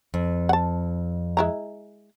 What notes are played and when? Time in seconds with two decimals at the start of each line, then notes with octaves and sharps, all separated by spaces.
0.14 F2
0.49 F#5 A5
1.37 G#3 E4 A#5